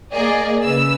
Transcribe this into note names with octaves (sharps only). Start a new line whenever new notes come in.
A#3 G#4 D5 D#5
C#3 B4 E6